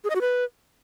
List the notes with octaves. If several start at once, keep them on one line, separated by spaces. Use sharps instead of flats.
G#4
D#5
F#4
B4